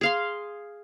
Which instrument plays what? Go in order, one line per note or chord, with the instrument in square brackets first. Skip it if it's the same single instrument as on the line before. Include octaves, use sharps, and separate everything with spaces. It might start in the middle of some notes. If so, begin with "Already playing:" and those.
[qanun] G#4 F5 C6